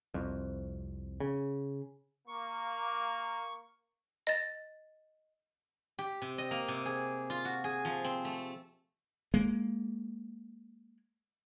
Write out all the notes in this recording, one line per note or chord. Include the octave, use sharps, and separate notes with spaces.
C2 F2
C#3
A#3 C#6
D#5 A6
G4
C3
D#5
A#3
C3
G#4
F4
F#4
G#4
F3
C4
A3
G#3 A#3